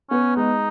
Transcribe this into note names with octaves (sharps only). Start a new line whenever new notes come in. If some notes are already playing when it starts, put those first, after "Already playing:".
B3 C#4
G#3 D#4